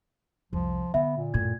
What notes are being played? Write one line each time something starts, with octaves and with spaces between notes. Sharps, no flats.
C2 F2 F3
D3 B3 E5
A#2
F#2 A2 G#6